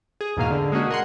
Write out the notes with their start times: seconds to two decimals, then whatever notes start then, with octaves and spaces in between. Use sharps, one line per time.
0.21 G#4
0.37 E2 G#2 B2 A#3 F5
0.51 D3
0.72 G#3 A#3 C#4 F#4 G#4
0.90 A#4 F#5 C6